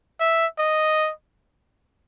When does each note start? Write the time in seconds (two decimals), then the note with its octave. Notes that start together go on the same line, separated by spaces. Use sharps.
0.20 E5
0.58 D#5